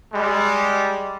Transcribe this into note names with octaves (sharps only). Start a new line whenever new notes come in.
G3 G#3